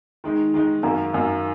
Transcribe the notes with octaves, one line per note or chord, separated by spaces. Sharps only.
D#3 G#3 D#4
D#3 G#3 D#4
F#2 D#3 A#3
F#2 D#3 A#3